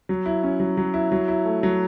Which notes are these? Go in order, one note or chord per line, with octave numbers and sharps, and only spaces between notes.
F#3
E4
C#4
F#3
F#3
E4
F#3
E4
A3
F#3